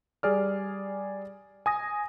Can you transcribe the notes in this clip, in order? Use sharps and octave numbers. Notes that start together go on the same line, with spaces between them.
G3 G#4 D5 F6
G#5 D#6 A#6